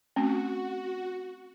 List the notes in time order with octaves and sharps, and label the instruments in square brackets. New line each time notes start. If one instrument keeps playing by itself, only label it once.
[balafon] A3 C4 C#4 [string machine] F#4